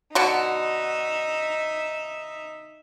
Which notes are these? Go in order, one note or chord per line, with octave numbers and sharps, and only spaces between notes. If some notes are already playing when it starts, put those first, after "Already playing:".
B2 D3 D#4 F#4 E5